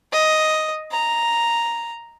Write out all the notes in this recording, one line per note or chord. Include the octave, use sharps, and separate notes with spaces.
D#5
A#5